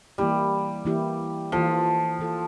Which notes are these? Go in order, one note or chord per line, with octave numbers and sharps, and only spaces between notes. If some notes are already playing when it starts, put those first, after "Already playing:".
E3 G3 A#3 E4 G4
E3 A#3 E4 G4
E3 F3 A#3 F4 A4
E3 A#3 F4 A4